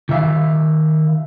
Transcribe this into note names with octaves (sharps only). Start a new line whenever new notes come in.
D#3 E5 F5